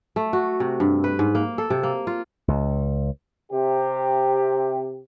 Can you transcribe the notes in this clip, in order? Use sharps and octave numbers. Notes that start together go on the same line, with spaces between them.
A3
F#4
C3
G2
B4
G#2
A#3
A4
C3
A#3
F4
C#2
C3 G4